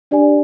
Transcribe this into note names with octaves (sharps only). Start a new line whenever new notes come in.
D4 G4 D5 G#5